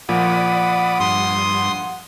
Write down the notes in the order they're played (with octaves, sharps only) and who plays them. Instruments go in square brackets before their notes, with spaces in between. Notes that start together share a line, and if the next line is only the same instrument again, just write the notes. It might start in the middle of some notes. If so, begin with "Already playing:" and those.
[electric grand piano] A#2 F3 [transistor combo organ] D5 B5 D#6 [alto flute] F#5
[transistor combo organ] G2 [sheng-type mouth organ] C6 D#6
[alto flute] F#5